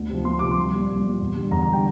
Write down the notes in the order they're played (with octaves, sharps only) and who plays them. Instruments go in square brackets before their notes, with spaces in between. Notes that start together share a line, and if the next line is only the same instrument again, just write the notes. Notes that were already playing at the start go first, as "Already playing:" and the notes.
Already playing: [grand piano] D2
C3 F3
D2 C6
C3 F3 D6
C6
C2
A#2 G3
C2
A#2 G3
E2
D3 G3
E2 A#5
A#5
D3
G3 G5